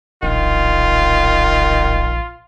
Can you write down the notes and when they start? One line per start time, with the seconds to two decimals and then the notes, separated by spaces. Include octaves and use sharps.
0.23 D1 A#1 D#3 F4